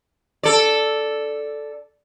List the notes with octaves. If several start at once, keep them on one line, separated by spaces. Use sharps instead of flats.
A4 D5